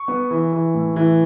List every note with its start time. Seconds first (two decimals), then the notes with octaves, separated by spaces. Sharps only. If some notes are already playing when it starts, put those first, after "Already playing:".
Already playing: C#6
0.08 B3
0.31 E3
0.52 E3
0.75 A2
0.96 E3